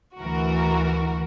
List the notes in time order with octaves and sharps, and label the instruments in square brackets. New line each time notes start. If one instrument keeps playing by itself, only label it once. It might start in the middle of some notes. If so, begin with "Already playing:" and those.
[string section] D2 E3 F#4 A#4